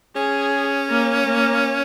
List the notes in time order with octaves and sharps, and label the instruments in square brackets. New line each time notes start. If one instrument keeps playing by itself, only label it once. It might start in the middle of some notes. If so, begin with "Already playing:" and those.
[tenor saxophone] C#4 [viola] G#4
[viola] A#3
A#3